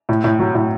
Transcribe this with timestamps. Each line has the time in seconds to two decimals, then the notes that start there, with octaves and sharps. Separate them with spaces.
0.09 A2
0.24 A2
0.39 F#3
0.55 A2